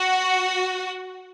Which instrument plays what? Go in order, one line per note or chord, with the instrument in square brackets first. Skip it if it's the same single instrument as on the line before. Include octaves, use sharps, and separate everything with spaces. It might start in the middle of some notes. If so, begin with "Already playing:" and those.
Already playing: [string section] F#4